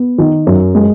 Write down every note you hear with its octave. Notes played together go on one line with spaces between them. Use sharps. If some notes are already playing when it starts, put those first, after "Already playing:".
Already playing: B3
D#3
F#2
G#3